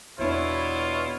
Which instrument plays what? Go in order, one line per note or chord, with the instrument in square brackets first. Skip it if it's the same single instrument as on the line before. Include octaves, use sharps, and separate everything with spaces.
[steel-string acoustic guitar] E2 B3 D4 [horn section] B2 E4 [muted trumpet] F4 [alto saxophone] C#5